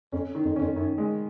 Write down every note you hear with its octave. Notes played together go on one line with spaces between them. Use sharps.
F2 C#4
D#3
F2
F2 C#4
F#2 D#3
G#3